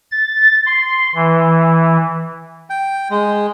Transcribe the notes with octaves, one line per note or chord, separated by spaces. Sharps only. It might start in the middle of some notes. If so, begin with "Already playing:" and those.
A6
C6
E3
G5
G#3